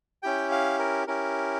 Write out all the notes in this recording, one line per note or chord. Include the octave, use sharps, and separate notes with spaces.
C#4 E4 G4 G5
F5
A#4
C#4 E4 G4 A#4